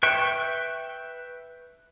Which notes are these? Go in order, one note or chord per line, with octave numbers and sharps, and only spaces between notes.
B4 E5 G5 C#6